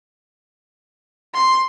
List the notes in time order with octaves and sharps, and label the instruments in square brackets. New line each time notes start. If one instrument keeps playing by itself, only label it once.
[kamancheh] C6